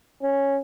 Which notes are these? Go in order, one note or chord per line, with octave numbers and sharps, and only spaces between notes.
C#4